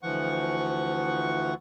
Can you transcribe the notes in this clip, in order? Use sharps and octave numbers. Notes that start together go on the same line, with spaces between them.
D2 E3 F3 F#5 C#6